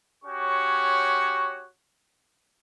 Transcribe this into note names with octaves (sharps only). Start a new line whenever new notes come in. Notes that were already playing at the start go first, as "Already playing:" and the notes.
C#4 F#4 G4 C#5 C#6